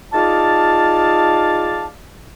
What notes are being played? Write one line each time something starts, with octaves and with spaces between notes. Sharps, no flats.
D#4 F4 G#4 D5 F5 A5